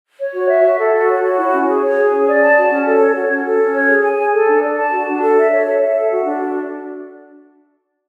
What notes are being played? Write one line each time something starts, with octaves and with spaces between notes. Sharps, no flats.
C#5
F#4
E5
F#4
A4
F#4
C#5
F#4
E4
C#4
G#4
C#5
G#4
C#4
D5
A5
F#4
C#4
A4
C#5
F#4
C#4
A4
C#4
C#5
G#4
G#5
G#4
A4
D4
D5
A5
F#4
D4
A4
E5
C#5
A4
E5
A4
F#4
D4